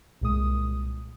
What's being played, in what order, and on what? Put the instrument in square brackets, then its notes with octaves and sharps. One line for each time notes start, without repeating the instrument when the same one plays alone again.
[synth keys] C2 A#2 G#3 D#6